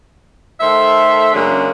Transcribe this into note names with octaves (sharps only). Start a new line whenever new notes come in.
D#3 A3 A4 C5 E5
F#2 C#3 F#3 G#3 A#3 D4